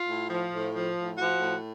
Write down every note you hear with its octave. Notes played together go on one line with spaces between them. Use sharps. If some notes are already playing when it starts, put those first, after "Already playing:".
Already playing: F4
A2
F3
A2
F3
A2
F3 F#4
A2